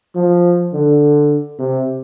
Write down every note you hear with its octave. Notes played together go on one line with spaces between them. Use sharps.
F3
D3
C3